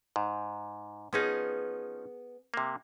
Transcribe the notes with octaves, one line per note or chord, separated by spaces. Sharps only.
G#2
F3 B3 C#4 D#4 G#4
C3 A#3